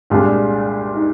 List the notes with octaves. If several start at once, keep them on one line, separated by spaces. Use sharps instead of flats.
C2 A#2 G#3 D4 F4 G#4
D#4